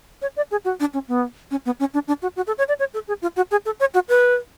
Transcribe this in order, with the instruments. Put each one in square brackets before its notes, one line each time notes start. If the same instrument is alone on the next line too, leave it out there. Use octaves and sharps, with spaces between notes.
[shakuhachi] C#5
D5
G#4
F#4
D4
C#4
B3
C#4
B3
C#4
D4
D4
F#4
F#4
A4
C#5
D5
C#5
A4
G#4
F4
F#4
G#4
A4
C#5
F#4
B4